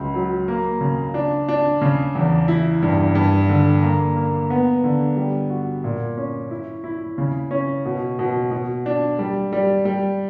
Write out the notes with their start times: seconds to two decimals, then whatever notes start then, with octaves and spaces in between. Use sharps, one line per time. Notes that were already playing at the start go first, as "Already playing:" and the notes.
Already playing: C#2 F#3
0.14 F#3
0.48 A#3
0.81 C#3
1.14 D4
1.49 D4
1.81 C#3
2.15 E2
2.48 E4
2.82 G2
3.15 G2
3.49 D3
3.82 A#3
4.16 A#3
4.50 B3
4.84 D3
5.16 G3
5.50 F#4
5.84 A#2
6.17 C#4
6.51 E4
6.84 E4
7.18 C#3
7.51 C#4
7.85 B2
8.19 B2
8.51 B2
8.86 D4
9.19 G3
9.53 G3
9.85 G3